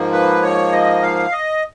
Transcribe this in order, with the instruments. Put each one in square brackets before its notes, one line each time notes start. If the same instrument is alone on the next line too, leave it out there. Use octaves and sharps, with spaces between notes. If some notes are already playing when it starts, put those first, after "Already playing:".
Already playing: [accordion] G#2 F3 A#3
B4
C#5
D#5
F5
D#5